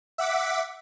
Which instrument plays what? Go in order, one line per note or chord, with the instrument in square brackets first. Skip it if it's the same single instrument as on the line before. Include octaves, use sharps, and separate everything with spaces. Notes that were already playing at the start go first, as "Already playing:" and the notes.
[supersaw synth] E5 F#5 D6 B6